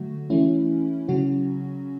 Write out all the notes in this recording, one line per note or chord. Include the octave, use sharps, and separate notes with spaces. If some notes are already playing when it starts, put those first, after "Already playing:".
Already playing: D3 F#3 A3 F#4
E3 A3 C#4 E4
C#3 F#3 C#4 F#4